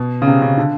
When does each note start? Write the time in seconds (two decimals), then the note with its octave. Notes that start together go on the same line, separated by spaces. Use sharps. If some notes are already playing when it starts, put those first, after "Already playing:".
Already playing: B2
0.22 C#3
0.27 C3
0.42 C#3
0.58 D3